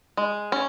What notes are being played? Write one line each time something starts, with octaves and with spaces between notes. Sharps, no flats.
G#3
C#4